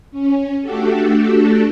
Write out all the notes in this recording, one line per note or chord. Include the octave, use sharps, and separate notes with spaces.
C#4
A3 D4 F#4 G4 A4